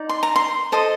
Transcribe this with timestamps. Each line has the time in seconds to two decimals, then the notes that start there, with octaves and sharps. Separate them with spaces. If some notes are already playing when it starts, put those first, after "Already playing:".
Already playing: D#4 D5
0.09 C6
0.23 A#5
0.36 C6
0.72 A4 C5 D#5